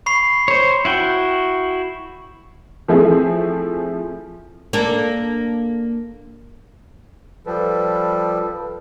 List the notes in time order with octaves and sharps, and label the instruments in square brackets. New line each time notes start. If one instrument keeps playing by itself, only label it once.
[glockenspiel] B5 C#6 C7
[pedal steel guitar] C5 C#5
E4 F#4 G5
[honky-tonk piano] F3 A3 C4 E4 G#4
[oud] A#3 D4 A4
[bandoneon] F3 G3 [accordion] A4 B4